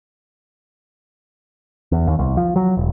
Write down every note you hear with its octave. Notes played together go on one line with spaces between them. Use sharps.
E2
D#2
C2
F3
F#3
E1